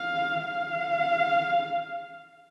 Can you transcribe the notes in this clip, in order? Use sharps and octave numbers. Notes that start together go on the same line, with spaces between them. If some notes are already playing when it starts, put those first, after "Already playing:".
Already playing: F5
F5